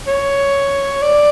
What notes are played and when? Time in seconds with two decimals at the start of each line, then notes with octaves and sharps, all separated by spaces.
0.07 C#5
1.02 D5